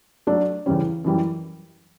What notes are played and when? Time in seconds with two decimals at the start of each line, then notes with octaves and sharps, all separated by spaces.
0.27 F#3 A3 D4 A4 D5
0.66 E2 C#3 G3 C#4
1.04 F#2 E3 G3